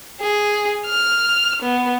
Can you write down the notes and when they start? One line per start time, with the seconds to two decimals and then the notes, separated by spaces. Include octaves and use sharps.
0.20 G#4
0.86 F6
1.62 B3